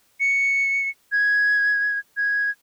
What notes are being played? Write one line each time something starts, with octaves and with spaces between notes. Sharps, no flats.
C#7
G#6
G#6